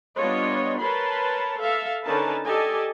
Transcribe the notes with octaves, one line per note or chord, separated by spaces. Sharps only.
G3 B3 D4 F4 C#5 D#5
A#4 B4 C#5 A5 B5 C6
A4 E5 F5
D3 C#4 D#4 A#4 B4 A5
G4 A4 D5 D#5 G#5 A5